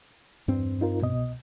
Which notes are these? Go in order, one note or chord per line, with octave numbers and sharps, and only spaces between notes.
E2 G2 C4
D#4 F4 A#4
C2 B2 D#5